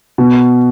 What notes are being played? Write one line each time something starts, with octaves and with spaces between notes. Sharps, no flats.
B2